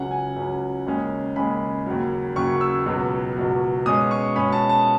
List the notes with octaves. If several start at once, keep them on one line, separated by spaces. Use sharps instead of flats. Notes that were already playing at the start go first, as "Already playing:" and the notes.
Already playing: C#2 C#3 F#3 C#4 F#5
G#5
C#2 C#3 F#3 C#4
D#2 C#3 G#3 C#4
D#2 C#3 G#3 C#4 B5
D#2 C#3 F#3
D#2 C#3 F#3 C#6
E6
C#2 B2 F#3
C#2 B2 F#3
B2 G#3 C#4 D#6
C#6
B2 G#3 C#4 B5
A5
A5